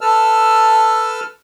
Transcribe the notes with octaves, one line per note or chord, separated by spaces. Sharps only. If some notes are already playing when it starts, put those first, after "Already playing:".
A4 B4 A5 E6 F6